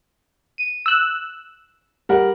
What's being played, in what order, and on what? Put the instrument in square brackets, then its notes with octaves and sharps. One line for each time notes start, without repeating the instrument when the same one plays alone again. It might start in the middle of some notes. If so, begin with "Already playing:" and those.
[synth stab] D#7
E6 F#6
[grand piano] G3 A#4 F#5